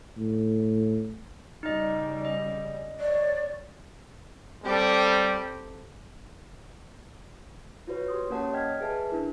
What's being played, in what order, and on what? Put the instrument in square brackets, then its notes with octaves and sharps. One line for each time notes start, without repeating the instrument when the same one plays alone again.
[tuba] A2
[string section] C#3 G3 [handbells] D#4 D#5
[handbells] D#5
[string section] C#5 [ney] D5
[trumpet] G3 [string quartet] C4 G4 A4
[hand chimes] F4 F#4 B4 C#5
G4 C6 D#6
A#3 C#4 A#4 C#5 F#5 A5
D5 D#5 G5 F6 G#6 B6
G#4 B4 E5 A5
D4 E4 A#4